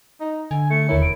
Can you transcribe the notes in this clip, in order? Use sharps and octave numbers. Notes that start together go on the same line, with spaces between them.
D#4
D3 G#5
A3 C#7
D#2 E4 A#4 C#5
E1 D7